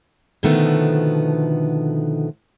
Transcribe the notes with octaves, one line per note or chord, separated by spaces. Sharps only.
B2 D3 D#3 F3 A3 B3